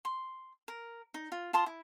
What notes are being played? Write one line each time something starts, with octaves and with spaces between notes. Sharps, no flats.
C6
A#4
D#4
F4
F4 A5 C6 D#6
E4